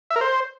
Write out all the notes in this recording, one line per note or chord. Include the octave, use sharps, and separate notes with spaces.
E5
A#4
C5